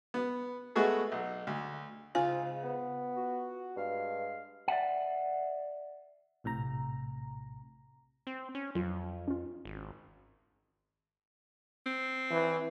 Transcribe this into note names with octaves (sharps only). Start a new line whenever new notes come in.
B3
G#3 A3 B3 F#4 G#4 A4
B1
D2
G#2 C#3 C4 F4 G#5
B3
F#4
G2 G#3 F5
D5 E5 F#5
A#1 A2 C3 A#5
C4
C#4
F2 F#3 F4
C#4 F4
G#1
C4
E3